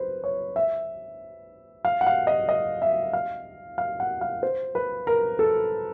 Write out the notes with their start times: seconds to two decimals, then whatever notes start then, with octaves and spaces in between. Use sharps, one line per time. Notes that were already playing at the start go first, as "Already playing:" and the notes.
Already playing: B4 C5
0.24 C#5
0.56 E5
1.85 F5
2.01 F#5
2.07 F5
2.27 D#5
2.49 D#5
2.82 E5
3.13 F5
3.78 F5
4.00 F#5
4.21 F5
4.43 C5
4.75 B4
5.07 A#4
5.39 A4